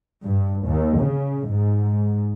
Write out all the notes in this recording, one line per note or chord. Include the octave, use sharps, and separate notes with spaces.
G2
D#2
C#3
G#2